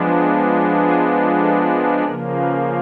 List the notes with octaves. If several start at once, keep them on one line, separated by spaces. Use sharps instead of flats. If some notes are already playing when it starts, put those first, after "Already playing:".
Already playing: F3 G#3 B3 D4
G#4
A4
A#4
C#3 F3 A#3 A#4
B4